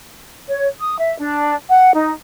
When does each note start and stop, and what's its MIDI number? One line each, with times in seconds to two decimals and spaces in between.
0.49 0.68 73
0.79 0.98 87
0.99 1.19 76
1.19 1.55 62
1.69 1.94 78
1.94 2.11 63